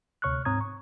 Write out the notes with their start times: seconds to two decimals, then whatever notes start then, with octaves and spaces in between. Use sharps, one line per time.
0.22 D2 C3 C#5 C#6 F6 F#6
0.45 G#2 C4 C#5 A#5 D#6 G#6
0.61 C#6